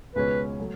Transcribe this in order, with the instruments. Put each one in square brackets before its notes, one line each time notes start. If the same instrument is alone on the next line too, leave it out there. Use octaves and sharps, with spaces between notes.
[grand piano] C#2 B2 G#3 C#4 [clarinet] B4
[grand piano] F#3 A3